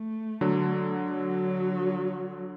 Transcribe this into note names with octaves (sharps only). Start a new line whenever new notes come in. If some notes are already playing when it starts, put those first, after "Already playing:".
Already playing: A3
D3 F#3
F#3